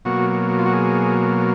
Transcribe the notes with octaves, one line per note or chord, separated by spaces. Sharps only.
B2 F#3 A#3 F#4
F4
F#4
G#4